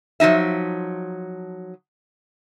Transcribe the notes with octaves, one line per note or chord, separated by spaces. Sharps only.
F3 F#3 D#4 E5